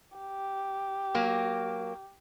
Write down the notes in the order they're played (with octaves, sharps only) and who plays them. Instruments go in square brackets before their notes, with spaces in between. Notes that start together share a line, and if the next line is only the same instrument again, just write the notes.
[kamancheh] G4
[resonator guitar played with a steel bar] F#3 A#3